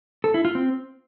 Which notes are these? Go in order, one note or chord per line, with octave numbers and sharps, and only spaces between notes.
A4
E4
F4
C4